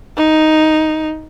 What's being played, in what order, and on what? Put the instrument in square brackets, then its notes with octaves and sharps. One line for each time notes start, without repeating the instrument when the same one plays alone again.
[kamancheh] D#4